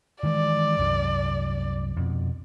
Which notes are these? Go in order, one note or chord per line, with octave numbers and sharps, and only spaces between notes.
D#3 E3 G#3 D5
C2 F#2
F2 B2